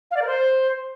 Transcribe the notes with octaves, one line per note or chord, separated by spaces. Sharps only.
F5
D5
A#4
C5